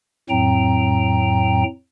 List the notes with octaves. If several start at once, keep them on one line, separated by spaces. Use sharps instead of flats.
F2 A2 F#3 C4 G5 A#5